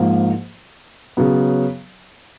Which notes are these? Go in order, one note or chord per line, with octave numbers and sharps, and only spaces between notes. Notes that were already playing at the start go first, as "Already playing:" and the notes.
Already playing: G#2 F3 A#3
C#3 F#3 B3